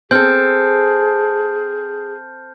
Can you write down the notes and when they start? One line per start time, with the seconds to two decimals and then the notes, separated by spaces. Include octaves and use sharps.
0.11 C4 G#4 A4 F6 G6